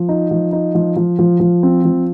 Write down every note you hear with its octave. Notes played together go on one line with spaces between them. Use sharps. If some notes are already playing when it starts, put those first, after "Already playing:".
Already playing: F3
D#4
F3
D#4
F3
F3
F3
F3
C4
F3